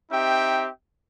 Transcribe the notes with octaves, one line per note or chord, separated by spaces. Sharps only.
C4 D#4 G4 E5 G5